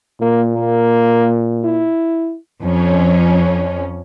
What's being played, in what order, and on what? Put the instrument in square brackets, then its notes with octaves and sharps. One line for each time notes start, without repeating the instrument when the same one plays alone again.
[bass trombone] A#2 [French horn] A#3
[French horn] A#3
E4
[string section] F2 C#4